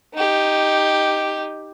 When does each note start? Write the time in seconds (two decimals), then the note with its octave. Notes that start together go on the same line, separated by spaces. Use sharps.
0.15 D#4 G4